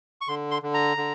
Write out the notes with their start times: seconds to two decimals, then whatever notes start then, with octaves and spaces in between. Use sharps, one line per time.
0.21 C#6
0.28 D3 C6
0.51 C6
0.63 D3
0.74 A#5
0.97 D3